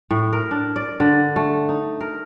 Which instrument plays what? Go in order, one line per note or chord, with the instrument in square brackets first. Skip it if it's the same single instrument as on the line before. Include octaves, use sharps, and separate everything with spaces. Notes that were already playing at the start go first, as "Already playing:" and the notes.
[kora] A2
A#4
D4
D5
D3
A3
D#4
A#4